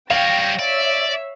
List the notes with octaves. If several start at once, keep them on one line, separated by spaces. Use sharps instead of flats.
G3 C#5 F5 G5 A#6
C#5 D5 E5